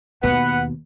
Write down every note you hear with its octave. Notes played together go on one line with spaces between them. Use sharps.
D#2 B2 B3 B4 F#5